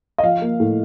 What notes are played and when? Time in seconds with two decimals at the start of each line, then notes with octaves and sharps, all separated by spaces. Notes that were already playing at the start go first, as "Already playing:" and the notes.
0.18 D#5
0.23 F3 F5
0.42 A#3
0.60 A2